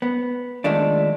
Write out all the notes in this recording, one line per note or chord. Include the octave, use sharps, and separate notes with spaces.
B3
D#3 F3 G#3 A3 D4